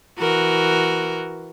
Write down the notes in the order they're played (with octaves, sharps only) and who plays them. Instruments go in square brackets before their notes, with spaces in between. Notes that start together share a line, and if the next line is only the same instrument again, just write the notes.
[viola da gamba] E3 F#4 A#4